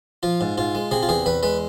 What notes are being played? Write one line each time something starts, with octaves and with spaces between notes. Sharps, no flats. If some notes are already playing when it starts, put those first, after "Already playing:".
F3 F4
G#2
G#2 F4
G#3
C3 G#4
F4
E2 G#4
E2 B4
G#3 B4